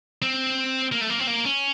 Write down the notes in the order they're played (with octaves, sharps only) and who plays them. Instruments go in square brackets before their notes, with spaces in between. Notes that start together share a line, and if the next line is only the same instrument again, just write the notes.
[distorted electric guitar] C4
A#3
A3
A#3
C4
A#3
C#4